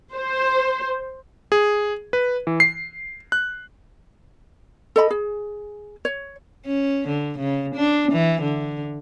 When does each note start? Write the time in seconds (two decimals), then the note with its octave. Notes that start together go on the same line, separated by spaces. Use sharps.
0.14 C5
1.52 G#4
2.13 B4
2.47 E3
2.60 C7
3.32 F#6
4.96 A4 D#5 B5
5.11 G#4
6.05 C#5
6.66 C#4
7.08 D3
7.39 C#3
7.76 D4
8.12 E3
8.42 D3